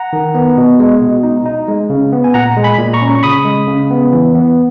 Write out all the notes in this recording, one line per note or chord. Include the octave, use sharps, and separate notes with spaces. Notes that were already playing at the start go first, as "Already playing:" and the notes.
Already playing: F#5 A#5
D#3
B3
B2
G#3
B2
D#4
D#4
G#3
C#3
B3
G#5
A#2 F#5 A#5
G#3
G#5 B5
A#2
A#5 C#6
C#4
C#6
C#3 B5 D#6
G#3
C#3
B3
E3
B3